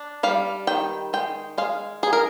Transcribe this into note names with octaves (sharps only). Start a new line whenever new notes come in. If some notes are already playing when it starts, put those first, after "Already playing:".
Already playing: D4
G3 F5
D#3 G5
G#3 G5
G#3 F5
D#4 G#4
A#4